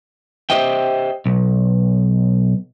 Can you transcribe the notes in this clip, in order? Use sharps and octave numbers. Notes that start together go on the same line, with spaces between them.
G4 C5 D#5 E5 G5
B1